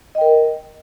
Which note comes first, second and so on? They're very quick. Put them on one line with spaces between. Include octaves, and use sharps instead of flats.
D#5 G5 A#4